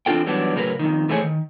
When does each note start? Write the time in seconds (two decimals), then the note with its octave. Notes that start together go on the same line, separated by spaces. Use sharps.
0.06 E2 C4 D4 F4 A4 G5
0.26 E3 F#3 G3 B3 D4
0.55 A2 C#3 F#3 F4 A#4 B4
0.79 F2 G#2 D#3
1.09 E3 A3 E4 G#4 C5 C#5
1.21 D#3